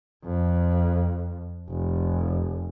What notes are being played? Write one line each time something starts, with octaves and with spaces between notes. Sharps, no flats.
F2
F1